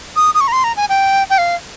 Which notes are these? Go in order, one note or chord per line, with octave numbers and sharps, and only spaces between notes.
D#6
D#6
C#6
A#5
C6
A#5
G#5
G5
G5
F5